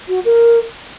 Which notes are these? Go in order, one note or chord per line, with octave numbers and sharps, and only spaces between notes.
F#4
A#4